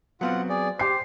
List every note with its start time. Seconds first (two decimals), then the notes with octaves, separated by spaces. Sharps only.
0.21 F#3 B3 C4 F4 F#5
0.49 G#4 D5
0.79 G4 C5 G5 C7